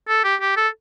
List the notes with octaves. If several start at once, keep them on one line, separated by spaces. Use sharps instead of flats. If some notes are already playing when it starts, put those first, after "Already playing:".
A4
G4
G4
A4